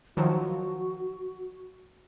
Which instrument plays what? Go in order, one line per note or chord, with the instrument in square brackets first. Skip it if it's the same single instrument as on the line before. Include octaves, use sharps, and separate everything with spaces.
[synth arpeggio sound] D#3 F3 F#3 [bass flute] F#4